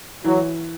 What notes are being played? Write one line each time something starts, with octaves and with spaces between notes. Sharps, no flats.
E3 F#3